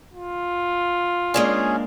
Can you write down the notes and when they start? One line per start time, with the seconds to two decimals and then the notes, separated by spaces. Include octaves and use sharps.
0.14 F4
1.34 G#3 A#3 C#4 D4 G#4